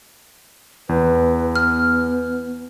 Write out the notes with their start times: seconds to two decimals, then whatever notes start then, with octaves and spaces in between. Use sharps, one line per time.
0.89 E2 B4
1.55 B3 F6